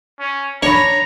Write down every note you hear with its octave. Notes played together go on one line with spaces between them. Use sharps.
C#4
D4 C#5 A#5 B5